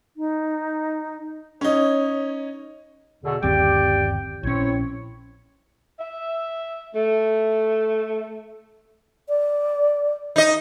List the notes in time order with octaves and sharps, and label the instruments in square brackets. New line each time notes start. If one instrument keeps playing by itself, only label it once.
[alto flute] D#4
[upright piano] C#4 D#4 [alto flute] C#5
[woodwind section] E2 B2 D3
[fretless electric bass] G1 D#2 C4 [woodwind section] G4 D5 G5
[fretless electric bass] A#1 C#4 [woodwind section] C4 E4 C#5
[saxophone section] E5
A3
[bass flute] D5
[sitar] D#4 D#5